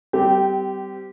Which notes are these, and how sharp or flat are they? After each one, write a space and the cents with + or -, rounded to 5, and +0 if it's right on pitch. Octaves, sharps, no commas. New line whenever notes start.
G3 -10 C4 -30 G4 -10